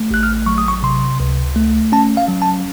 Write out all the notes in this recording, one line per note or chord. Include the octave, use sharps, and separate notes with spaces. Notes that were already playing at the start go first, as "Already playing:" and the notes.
Already playing: A3
A1 F#6
F6
F#3 C#6
D#6
C#6
C3 C6
C#2
A3
C#4 A5
F5
F#3
A5